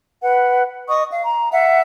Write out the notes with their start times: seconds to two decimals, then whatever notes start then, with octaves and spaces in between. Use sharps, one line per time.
0.22 B4 F#5
0.88 D#5 C#6 D#6
1.11 F5
1.24 A#5
1.52 E5 F#5